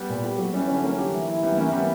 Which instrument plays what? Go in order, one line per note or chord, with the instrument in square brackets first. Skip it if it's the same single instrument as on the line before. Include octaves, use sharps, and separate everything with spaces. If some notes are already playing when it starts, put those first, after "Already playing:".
Already playing: [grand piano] G3 B3
[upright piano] A#2
G4
F#3
[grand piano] E3 G3 [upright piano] C#4
[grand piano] D3 F#3 [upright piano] C#4
[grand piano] F#3 A#3 [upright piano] C#4
[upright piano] G4
E3
E4
[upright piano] E3 [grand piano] G3 B3
[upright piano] E3 [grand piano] A#3 C#4
[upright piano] E3 [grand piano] G3 B3